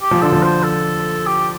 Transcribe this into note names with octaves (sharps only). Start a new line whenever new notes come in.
G4
F3
D3 A4
F3
C5
A4
G4